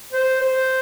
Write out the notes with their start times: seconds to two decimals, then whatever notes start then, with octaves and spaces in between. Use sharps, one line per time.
0.13 C5
0.41 C5